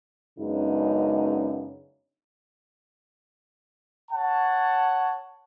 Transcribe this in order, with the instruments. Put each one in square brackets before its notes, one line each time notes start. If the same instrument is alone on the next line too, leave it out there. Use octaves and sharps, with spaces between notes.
[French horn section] F#2 C#3 G#3 B3 D4 D#4
[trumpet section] C#5 F#5 A5